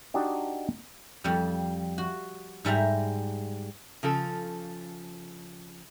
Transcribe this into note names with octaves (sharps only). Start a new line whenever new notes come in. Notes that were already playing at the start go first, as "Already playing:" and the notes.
D4 D#4 F#4 G4 D#5
F2 G3
F#4
G#2 G3 E5 A#5
C#3 F3 A4